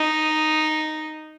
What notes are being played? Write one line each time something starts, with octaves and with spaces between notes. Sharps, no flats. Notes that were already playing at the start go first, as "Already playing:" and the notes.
Already playing: D#4